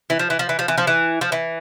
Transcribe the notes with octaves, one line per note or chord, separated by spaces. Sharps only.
E3
F3
E3
F3
E3
F3
E3
F3
E3
F3
E3